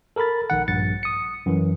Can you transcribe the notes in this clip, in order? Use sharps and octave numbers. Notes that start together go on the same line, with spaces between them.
A4 A#4 A#5 B5 A6
A#1 D#3 F#5
A#1 G2 A6 C#7
D#6 C#7
F#2 E3